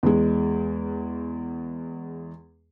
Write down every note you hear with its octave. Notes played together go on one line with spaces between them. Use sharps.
E2 G#3